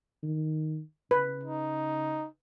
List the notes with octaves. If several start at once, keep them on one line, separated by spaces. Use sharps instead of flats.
D#3
C#3 B4
D#4